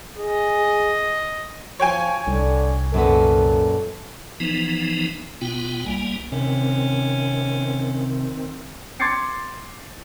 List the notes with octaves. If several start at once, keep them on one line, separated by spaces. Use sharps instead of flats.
G#4 D#5
F3 C#5 G5 G#5
C2 D3
F#2 A#2 B3 A4
E3 F3 B3 D#4
B2 B3 F4 G5
B1 G3 A#3 G#5
C3 D#3 C4 C#4
C6 D6 G#6 A6 C7 C#7